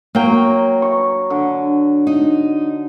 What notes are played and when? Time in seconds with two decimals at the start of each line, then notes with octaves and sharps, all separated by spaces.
0.15 F#3 A#3 G5
0.82 C#6
1.30 D3
2.07 D#4